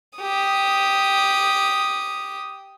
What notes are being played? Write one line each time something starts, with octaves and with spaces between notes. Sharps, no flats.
G4 D#6